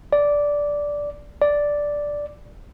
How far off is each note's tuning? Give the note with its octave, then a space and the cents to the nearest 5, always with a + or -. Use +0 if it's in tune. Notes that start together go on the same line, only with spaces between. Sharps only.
D5 -10
D5 -5